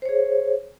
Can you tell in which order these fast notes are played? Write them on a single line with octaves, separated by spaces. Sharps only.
C5 C#5 G#4